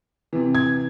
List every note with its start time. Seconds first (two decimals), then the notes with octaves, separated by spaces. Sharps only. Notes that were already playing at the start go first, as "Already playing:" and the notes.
0.33 C3 E3
0.55 G#6